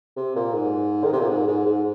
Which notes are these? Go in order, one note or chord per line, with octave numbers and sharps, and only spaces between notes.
C3
A#2
G#2
D#3
C3
A#2
G#2
G#2
G#2